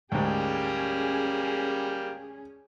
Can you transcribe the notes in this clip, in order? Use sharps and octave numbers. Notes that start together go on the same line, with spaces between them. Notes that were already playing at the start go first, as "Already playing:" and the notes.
D2 G#2 G3 A#3 C#4 G#4 G5